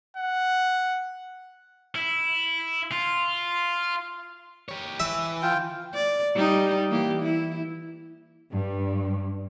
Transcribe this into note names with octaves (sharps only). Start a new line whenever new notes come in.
F#5
E4
F4
G4 C#5
E3 E5
F4 G5
D5
G3 D#4
E3 A#3 G4
E4
G2